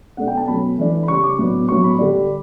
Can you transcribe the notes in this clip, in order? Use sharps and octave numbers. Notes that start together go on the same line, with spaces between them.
B2 A3 D4 F#5
G5
A5
B2 F#3 A3 C#4 B5
E3 A3 D4
B5
C#3 G3 C#4 C#6
D6
A2 F#3 B3 D4
A2 F#3 B3 C#6
B5
D3 G3 D4